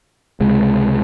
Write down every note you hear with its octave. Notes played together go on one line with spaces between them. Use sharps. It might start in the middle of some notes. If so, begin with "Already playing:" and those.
C#2 C3 G#3